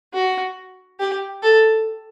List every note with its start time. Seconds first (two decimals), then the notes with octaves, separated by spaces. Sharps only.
0.14 F#4
1.00 G4
1.43 A4